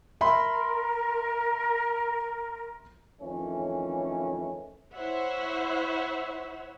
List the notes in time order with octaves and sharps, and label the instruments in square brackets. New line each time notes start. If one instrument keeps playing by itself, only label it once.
[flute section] A#4 [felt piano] E5 B5 C6
[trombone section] F2 D#3 E3 A3 C#4
[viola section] E4 C5 C#5 E5 F#5